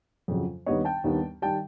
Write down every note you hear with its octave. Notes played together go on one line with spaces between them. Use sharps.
F2 C#3 F#3
D#2 D#3 G3 B3 D4 C#5 D#5
G5 A5
D#2 D#3 G3 B3 D4
D#3 G3 G5 A5